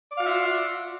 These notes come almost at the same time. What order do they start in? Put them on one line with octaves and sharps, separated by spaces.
D5 F5 F#4 E5 F4